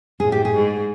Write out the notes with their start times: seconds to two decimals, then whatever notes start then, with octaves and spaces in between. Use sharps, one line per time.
0.20 A2 G#4
0.32 G4
0.45 G#4
0.53 G#2